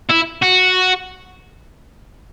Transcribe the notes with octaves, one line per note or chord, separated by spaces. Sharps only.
E4
F#4